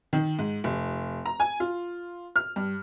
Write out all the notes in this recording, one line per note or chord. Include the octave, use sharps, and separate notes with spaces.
D#3
G#2
F1
A#5
G#5
F4
F6
G2